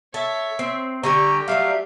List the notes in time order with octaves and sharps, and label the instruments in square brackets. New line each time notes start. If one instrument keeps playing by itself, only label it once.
[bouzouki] A4 [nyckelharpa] C#5 E5
[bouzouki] C4
[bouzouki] D3 G3 G#5 [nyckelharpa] G4 [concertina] A#5 [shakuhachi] C#6
[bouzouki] F#3 G3 A3 [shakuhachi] E5 [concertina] F5